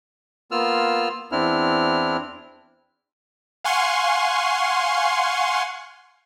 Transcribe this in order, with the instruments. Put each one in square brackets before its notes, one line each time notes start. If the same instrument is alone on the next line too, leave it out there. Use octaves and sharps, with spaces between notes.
[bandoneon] A#3 B3 F4 E6 F6
E2 C4 D4 E4 F6
[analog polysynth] F5 F#5 G#5 C6 C#6